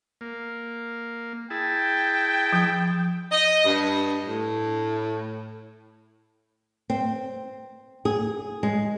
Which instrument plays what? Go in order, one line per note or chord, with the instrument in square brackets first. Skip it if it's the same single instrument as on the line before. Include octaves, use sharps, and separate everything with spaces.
[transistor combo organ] A#3
[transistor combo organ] E4 G#4 A5 [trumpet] G5
[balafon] F3
[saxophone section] D#5
G2
A2
[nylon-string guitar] C4
G#4
G#3